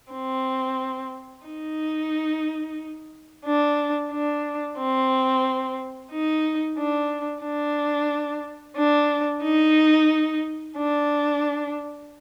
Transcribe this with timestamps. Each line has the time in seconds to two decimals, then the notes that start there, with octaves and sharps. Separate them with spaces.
0.13 C4
1.47 D#4
3.46 D4
4.12 D4
4.78 C4
6.12 D#4
6.78 D4
7.44 D4
8.77 D4
9.43 D#4
10.77 D4